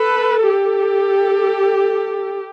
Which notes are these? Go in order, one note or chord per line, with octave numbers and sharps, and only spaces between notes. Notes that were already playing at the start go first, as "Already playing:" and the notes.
Already playing: A4 B4
G4 A4